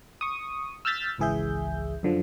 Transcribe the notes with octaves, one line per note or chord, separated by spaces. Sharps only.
C#6 D#6
E6 F6 G6 A6 B6
G#1 C#2 E3 G#4 E5 G6
F#2 D3 F3